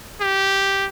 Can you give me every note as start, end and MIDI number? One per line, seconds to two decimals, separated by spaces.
0.21 0.86 67